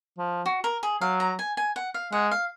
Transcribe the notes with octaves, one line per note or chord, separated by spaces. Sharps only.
F3
F#4
A#4
G#4
F#3 F5
A#5
G#5
G#5
F#5
F5
G#3 F#5
F5